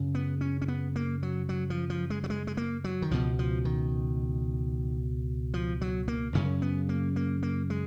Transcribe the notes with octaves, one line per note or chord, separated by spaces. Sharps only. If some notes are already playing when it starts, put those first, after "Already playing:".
Already playing: F#2 C#3
B3
C#4
C#4
B3
A#3
F#3
F#3
F3
F3
G#3
F#3
G#3
G#3
A#3
F#3
D#3
C#2 B2 F3
F3
D#3
F3
F#3
A#3
F#2 C#3 C#4
B3
A#3
A#3
A#3
G#3